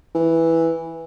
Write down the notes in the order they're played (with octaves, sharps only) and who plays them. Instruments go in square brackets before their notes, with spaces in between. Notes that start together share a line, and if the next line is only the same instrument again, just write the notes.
[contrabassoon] E3